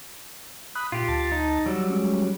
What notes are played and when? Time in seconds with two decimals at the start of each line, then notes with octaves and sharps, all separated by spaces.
0.75 B5 D#6 F#6
0.92 A#2 F4 G4
1.08 D2 A5 A6
1.32 D#4
1.66 F#3 G3 E6
1.90 G#3 C#4